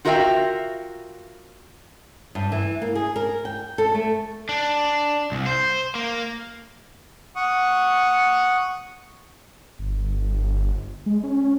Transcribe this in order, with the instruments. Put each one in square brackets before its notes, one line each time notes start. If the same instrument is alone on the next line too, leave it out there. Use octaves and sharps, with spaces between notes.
[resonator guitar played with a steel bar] F4 F#4 A#4 E5 F5 G5
[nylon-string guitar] G2
E3
A#3
G#4
A#4
G5
A4
A3
[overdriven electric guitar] D4
C2
C5
A#3
[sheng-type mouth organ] F#5 C#6 D#6
[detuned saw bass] G1
G#3
C#4